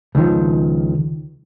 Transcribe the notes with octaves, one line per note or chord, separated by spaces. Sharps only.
C#2 D#3 F3